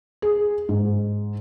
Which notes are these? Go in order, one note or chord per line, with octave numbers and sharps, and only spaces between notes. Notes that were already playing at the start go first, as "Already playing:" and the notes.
G#4
G#2